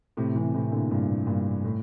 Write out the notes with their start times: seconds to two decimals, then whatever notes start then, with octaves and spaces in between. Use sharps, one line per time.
0.17 A2 C3
0.35 C3 E3
0.54 A2 C3
0.72 A#2 D3
0.91 G2 A#2
1.27 G2 A#2
1.64 A2